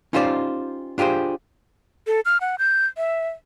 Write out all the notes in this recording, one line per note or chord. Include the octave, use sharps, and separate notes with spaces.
C#4 D#4 F4 G4 C5 D5
D4 F4 G4 G#4 C5
A4
F6
F#5
G6
E5